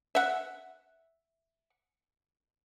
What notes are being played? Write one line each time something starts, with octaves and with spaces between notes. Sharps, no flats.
E5 F#5